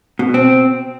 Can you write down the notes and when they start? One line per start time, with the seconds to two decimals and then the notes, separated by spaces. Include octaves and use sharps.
0.19 B2
0.34 C4